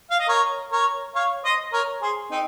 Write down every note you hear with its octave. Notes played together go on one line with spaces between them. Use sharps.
F5
D#5
A#4 C#5
A#4 C#5
C#5 F5
C5 D#5
A#4 C#5
G#4 C5
C4 D#4